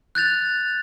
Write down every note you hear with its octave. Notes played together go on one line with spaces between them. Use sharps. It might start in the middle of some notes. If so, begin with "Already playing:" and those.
F#6 G6 A6 F7